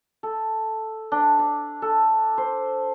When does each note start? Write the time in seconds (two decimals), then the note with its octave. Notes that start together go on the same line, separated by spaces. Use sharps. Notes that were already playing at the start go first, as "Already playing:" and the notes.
0.23 A4
1.12 D4
1.39 D5
1.82 A4
2.38 C5